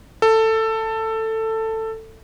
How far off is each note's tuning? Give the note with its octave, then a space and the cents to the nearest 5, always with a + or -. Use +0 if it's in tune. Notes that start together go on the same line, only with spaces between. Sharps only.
A4 +15